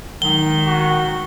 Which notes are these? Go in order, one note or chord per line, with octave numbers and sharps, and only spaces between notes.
D#3 F#3 G#3 D#4 G7
F#4